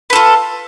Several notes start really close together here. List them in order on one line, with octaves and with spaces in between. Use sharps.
B4 A4 F4